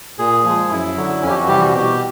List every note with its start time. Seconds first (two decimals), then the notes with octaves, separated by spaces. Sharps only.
0.19 A#2 G#4
0.44 F3 G#3
0.70 F#2 E4
0.97 D3 F#3
1.22 F2 C#4
1.30 G4
1.34 F#4
1.47 C3 E3 G3 G4
1.60 F#4
1.73 B2 G4